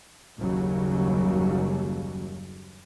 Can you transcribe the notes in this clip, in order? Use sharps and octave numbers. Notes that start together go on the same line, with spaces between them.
F#1 D#2 C#3 F#3 G3